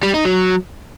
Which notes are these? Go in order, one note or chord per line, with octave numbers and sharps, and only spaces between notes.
G3
D#4
F#3